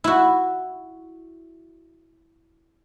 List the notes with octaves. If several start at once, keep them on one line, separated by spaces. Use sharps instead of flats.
E4 F#4